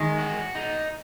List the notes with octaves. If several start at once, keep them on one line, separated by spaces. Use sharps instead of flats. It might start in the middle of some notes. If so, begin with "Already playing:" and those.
Already playing: D#3 G#3
F#4
D#4